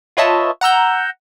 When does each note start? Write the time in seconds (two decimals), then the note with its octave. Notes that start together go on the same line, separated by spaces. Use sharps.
0.17 F4 B4 C#5 D#5 E5 A5
0.61 F#5 A#5 E6 G6